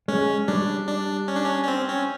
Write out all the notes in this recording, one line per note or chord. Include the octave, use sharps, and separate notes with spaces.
G#3 C#4
G3 D4
D4
C#4
D4
C#4
C#4
C4
C#4